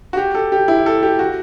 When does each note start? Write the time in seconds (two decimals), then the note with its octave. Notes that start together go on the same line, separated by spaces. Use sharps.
0.13 F#4
0.17 G4
0.35 A4
0.52 G4
0.68 E4
0.86 A4
1.03 G4
1.19 F#4